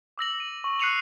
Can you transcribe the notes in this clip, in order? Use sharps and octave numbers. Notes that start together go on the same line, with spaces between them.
D6 E6 A#6 F#7
D#7
C#6
F#6 C7 C#7 D#7 F7 F#7